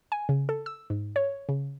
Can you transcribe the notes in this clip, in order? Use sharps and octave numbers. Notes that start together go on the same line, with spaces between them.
G#5
C#3
A4
E6
G#2
C#5
C#3